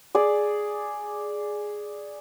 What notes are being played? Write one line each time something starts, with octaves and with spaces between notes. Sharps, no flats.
G#4 D5